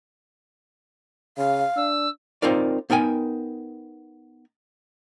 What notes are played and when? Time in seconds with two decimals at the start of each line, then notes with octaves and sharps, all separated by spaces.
1.38 C#3 F5
1.76 D4 E6
2.42 C4 D#4 F4 A#4 D5
2.90 B3 D#4 A#4 G5 G#5